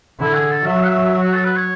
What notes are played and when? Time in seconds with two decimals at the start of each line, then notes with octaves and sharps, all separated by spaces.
0.20 D3 E4
0.35 G#4
0.50 A4
0.66 F#3 E5
0.84 F#5
0.88 E5
1.22 F#4
1.33 A4
1.44 B4
1.56 C#5